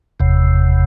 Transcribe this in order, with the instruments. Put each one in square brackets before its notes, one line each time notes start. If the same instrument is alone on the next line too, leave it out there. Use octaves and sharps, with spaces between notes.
[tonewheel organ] F#1 E2 C3